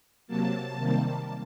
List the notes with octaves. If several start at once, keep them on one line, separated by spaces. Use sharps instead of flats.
C3 F#3 A#3 A5
C3 D#3 G3 A#3